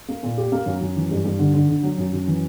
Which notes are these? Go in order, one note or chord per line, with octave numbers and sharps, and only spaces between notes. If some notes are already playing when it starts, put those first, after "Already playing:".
A#3
A#2
G4
A#3
F#2
F#2
E3
G2
G2
D3
D3
D3
F#3
F#2
F#2
E3